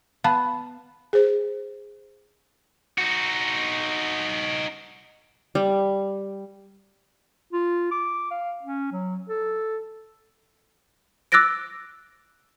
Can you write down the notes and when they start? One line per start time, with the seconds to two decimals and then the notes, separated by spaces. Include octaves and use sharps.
0.24 B3 F5 A5
1.13 G#4 C5
2.98 D#4 F#4
5.55 G3
7.53 F4
7.92 D6
8.31 F5
8.63 C#4
8.92 F#3
9.29 A4
11.32 D6 E6 F#6 A6 A#6 D7